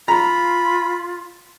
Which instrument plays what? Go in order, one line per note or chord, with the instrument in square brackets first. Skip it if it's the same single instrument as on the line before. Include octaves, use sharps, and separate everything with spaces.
[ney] F4 [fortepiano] A#5 [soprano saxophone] B5